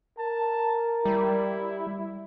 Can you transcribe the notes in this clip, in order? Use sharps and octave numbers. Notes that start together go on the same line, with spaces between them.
A#4 A5
G3 E4